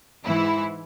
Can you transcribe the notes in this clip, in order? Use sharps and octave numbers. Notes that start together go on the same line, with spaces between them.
G#2 E3 E4